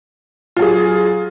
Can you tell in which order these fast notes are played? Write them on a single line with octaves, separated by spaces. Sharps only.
F4 F#3 G#4